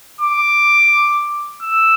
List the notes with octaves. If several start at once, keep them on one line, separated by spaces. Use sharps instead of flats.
D6
E6